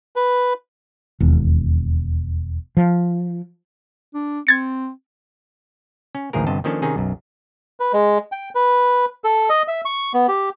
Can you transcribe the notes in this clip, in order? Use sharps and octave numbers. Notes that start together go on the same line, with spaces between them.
B4
E1 D#2
F3
D4
C4 G#6 A6 C#7
C#4
A1 D2 G#2 F3 G#4 A#4
G1 G2 C3 D#5 A5
D#3 F3 A#3 C#4 D4 A4
C3 D#3 C#4 D#4 G#4
B1 F#2
B4
G#3
G5
B4
A4
D#5
E5
C#6
B3
G4